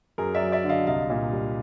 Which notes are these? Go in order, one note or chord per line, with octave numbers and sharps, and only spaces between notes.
F#2 G#4 A#4
D5 E5
F#3
D5 E5
D3
D#5 F5
C2 D#5 F5
A#2
G3